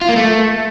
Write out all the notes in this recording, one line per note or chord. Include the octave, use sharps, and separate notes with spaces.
F4
A#3
A3